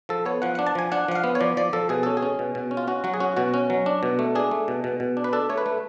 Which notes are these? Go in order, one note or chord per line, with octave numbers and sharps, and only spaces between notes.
F3 A4
B3 C#5
F3 F#5
D4 F#5
A5
F3 G#5
D4 F#5
F3 F#5
F5
B3
C#5
F3 D5
F3 D5
F3 A4
B2 G#4
C#4 A4
G#4
C#4
B2
B2
C#4
F4
C#4 F#4
F#3 F#4
G#4
C#4 F#4
B2 F#4
C#4
F#3
D4
B2
A3
D4 G#4
A3
B2
B2
B2
D4
B4
D4 A4
A3 C#5
B4
A3